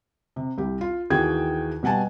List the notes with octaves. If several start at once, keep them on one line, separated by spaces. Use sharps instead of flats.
C3
C2 G4
F4
D#2 E3 F#4 G#4 G5 G#6
B2 G3 F#5 G#5 A5